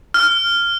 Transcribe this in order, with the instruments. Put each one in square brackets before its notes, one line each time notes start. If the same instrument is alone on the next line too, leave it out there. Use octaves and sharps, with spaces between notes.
[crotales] F6